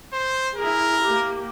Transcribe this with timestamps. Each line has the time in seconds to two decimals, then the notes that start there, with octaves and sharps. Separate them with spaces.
0.13 C5
0.56 E4 G#4 A#4
1.03 A#3 G4